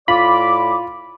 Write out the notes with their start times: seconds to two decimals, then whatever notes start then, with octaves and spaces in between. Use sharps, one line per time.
0.08 A2 F4 D5 B5 D6